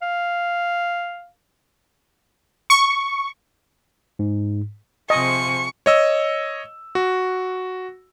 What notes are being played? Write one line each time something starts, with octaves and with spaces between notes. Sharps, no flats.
F5
C#6
G#2
C3 F3 G#4 D#5 C#6
C#5 D#5 E6
F#4